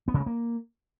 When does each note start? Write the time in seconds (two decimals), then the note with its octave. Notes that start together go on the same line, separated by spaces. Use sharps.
0.08 B3
0.14 C#3
0.20 G#3
0.26 A#3